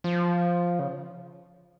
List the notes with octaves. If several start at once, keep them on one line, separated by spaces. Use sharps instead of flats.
F3
C#3